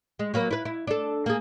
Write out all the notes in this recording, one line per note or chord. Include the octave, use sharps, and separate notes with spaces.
G#3
F#3 A#3 B4
E4 B4
E4
D4 A4
A#3 G#4